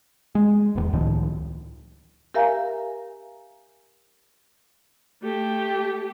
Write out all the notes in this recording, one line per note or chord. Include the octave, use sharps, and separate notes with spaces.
G#3
D#1 E2
C#2 A2 D#3 F3
G4 A#4 E5 F5 G#5 A#5
A3 G4